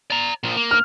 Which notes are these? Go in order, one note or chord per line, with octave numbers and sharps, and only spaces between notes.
D5 A#5
A#2 F3
A#3
F6